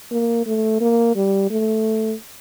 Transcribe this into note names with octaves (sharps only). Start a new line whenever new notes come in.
A#3
A3
A#3
G3
A3